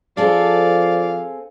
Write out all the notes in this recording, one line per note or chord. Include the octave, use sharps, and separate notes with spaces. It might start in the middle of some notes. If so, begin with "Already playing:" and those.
F3 C4 G#4 A4 D5 F5